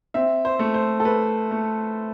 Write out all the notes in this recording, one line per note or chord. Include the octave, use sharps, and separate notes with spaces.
C4 E5
C5
A3
C5
A4
A3 B4
A3